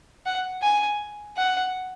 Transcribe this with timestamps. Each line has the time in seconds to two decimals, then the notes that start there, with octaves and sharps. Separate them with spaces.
0.26 F#5
0.62 G#5
1.37 F#5